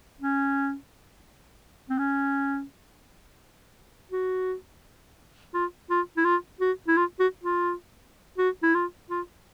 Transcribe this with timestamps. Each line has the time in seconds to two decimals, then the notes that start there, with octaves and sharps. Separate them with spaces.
0.21 C#4
1.89 C4
1.99 C#4
4.11 F#4
5.54 F4
5.90 F4
6.17 E4
6.25 F4
6.61 F#4
6.88 E4
6.97 F4
7.19 F#4
7.43 F4
8.38 F#4
8.63 E4
8.74 F4
9.10 F4